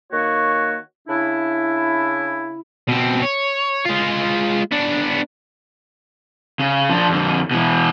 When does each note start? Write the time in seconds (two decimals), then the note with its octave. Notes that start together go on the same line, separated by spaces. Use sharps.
0.12 D#3 A#3 F#4 C#5 C#6
1.08 C#3 D4 E4
2.88 B2 C4
3.23 C#5
3.86 G#3 F4
4.71 B3 D4
6.59 C#3
6.90 F3 D4
7.10 F2 D3
7.51 B2 E3